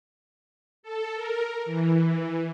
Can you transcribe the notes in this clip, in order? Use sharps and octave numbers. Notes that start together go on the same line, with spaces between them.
A4
A#4
E3